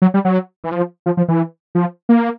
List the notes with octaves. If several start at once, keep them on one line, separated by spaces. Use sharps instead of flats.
F#3
G3
F#3
E3
F3
F3
F3
E3
F3
A#3